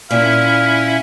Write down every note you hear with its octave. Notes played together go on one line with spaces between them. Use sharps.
A#2 C#4 E4 E5 F5